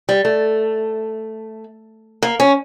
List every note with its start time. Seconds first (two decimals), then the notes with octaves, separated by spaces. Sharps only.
0.09 G3
0.25 A3
2.23 A#3
2.40 C#4